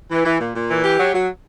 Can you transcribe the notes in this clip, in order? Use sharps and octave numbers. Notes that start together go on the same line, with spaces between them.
E3
E3
A#2
A#2
E3
G4
F#3
F#3